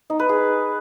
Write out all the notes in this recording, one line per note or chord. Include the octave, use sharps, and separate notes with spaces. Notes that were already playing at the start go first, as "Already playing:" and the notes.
D#4
B4
G#4